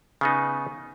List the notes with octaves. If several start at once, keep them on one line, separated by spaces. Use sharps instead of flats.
C#3 B3 D#4